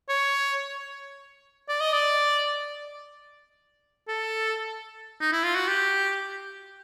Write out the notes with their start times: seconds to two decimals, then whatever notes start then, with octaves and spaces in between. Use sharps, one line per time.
0.09 C#5
1.69 D5
1.80 D#5
1.93 D5
4.08 A4
5.21 D#4
5.32 E4
5.44 F4
5.55 F#4
5.68 G4